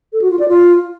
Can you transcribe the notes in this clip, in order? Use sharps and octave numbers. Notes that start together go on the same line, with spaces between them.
A4
F#4
F4
D5
F4